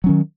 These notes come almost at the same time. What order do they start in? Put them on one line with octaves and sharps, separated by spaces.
F#3 C#4 D#3